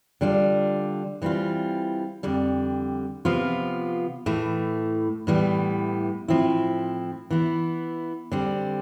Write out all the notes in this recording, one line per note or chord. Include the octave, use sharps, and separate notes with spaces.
D3 G3 D4 F4
E3 G3 C4 F4
F2 D3 G3
C3 F3 B3 F4
A2 E3 A3
A2 E3 G3 B3
A2 F3 C4 E4
E3 B3 E4
D3 G3 C4